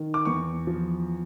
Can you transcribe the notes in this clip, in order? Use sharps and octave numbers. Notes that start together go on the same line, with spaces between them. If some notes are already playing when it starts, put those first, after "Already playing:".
Already playing: D#3
D6
E2 C#6
F3